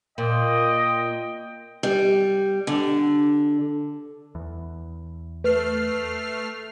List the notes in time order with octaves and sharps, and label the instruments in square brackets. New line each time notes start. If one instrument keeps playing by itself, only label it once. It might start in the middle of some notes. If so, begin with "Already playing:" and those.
[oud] A#2 [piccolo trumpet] D#5 [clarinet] G5
[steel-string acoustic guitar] G3
D3
[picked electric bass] E2
[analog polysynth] A3 F6 C7 [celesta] B4